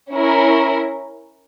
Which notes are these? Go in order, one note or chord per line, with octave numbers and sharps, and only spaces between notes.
C#4 E4 A#4